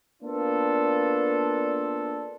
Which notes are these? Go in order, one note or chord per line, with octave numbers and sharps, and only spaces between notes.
A#3 B3 D4 F4 A4